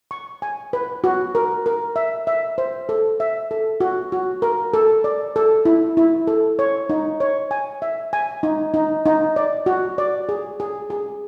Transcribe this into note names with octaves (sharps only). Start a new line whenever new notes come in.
C#6
G#5
B4
F#4
A#4
A#4
E5
E5
C5
A4
E5
A4
F#4
F#4
A#4
A4
D5
A4
E4
E4
A4
C#5
D#4
C#5
G#5
E5
G#5
D#4
D#4
D#4
D5
F#4
D5
G#4
G#4
G#4